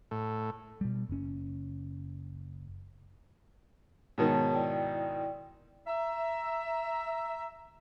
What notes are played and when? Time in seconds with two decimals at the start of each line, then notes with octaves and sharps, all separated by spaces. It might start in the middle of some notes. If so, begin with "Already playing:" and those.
0.11 A2
0.81 B2 G3
1.09 F#1 C#4
4.18 G#2 B2 D#3 G#4 C#5 A5
4.54 E4 D5 G5
5.87 E5 A#5